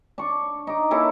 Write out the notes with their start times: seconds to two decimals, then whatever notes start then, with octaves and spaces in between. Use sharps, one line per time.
0.18 D4 C#6
0.67 D#4 D6
0.91 A#3 C#4 E4 A4